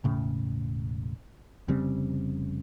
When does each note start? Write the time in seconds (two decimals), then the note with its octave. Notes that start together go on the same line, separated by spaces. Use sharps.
0.04 E1 A2 C#3
1.68 F1 C#3 G3 C4